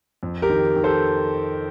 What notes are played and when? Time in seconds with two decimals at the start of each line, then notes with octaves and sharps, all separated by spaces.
0.23 F2
0.42 G4 A#4
0.49 D#3
0.76 D#3
0.84 A4 C5